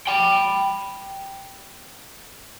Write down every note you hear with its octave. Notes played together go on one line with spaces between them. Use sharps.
G5 B5